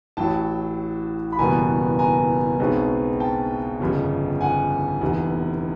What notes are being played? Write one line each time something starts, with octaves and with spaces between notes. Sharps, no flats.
A1 A2 F#3 G5 A5
B5
F#1 E2 B2 G3 B3 G#5 A#5
G#5 A#5
B1 B2 G#3 C4
G5 A5
G1 F2 C#3
F#5 G#5
F1 E2 C3